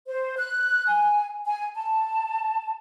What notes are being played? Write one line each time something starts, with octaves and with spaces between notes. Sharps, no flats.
C5
F#6
G#5
G#5
A5